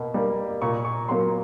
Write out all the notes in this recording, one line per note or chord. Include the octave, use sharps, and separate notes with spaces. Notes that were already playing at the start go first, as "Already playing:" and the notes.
Already playing: B2 A#3
G3 A#3
A#2 C#6
C#6
F#3 A#3 C6